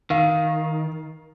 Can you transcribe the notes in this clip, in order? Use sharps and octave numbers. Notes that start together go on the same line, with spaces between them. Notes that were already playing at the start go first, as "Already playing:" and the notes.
D#3 F5